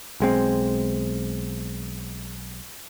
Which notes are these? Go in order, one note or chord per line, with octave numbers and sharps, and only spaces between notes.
B1 G#3 C4